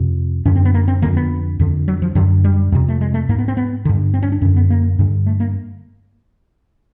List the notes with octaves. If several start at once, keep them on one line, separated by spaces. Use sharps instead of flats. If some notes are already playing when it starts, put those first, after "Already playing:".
Already playing: F2 C3
F#2 D3 C#4
C4
B3
A#3
C4
F2 D3 A#3
B3
F2 D3
F#3
F3
F#2 D3 F#3
G3
F2 C3
A3
G#3
A3
G#2 A#3
B3
C4
B3
G2 D3
C4
C#4
D4
F#2 D3 C#4
B3
A#3
G2 D3
A3
A#3